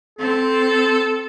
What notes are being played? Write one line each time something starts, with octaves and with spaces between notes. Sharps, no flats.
C4 A4